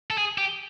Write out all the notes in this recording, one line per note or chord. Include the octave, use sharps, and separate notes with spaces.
A4
G#4
G4